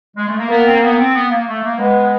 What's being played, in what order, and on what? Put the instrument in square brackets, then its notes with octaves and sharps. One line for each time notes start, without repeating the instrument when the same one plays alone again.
[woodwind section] G#3
A3
A#3
[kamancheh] A#3 [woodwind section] B3
[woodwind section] C4
B3
C4
B3
A#3
A3
A#3
[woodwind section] G#3 [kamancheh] B3